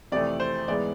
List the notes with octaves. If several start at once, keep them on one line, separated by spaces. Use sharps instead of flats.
F2 C3 E3 A3 D5
C5
G#2 E3 G#3 B3 D5